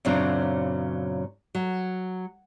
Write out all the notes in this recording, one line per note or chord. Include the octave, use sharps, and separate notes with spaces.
F#2 A#2 C#3 F#3 C4 D4
F#3